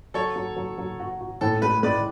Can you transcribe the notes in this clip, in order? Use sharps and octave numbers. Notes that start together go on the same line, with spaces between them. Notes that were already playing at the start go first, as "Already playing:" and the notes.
F#3 A4 C#5
F#3
F#3
F#3
F#4
F#4
A2 A4
G#3 B4
G#3 B4 D5